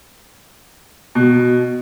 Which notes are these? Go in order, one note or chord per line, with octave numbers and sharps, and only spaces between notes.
B2